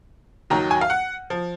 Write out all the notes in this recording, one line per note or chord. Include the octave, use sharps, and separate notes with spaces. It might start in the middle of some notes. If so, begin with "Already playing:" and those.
D#2 D#3 F#3 A#5
G#5
F5
F#5
F3